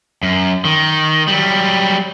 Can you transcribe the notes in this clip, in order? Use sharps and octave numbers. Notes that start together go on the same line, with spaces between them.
F#2
D#3
F#3 G3